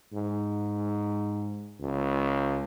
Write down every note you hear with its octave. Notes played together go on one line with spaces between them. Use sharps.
G#2
C#2